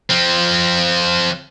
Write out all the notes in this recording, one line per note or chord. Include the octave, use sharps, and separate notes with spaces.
F3 C4